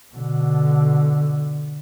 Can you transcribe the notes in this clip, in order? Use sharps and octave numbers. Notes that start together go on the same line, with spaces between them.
B2 D3